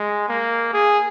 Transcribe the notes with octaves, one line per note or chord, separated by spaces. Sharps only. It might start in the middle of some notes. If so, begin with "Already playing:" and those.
Already playing: G#3
A#3
G#4